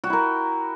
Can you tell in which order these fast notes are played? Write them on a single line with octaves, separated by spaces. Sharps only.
F#4 G5 E4 A#4